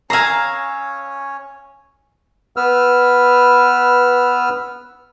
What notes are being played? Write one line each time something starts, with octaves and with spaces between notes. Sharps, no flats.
C#4 C#5 F5 G#5 A#5 E6 C7
B3 B4 E6 F6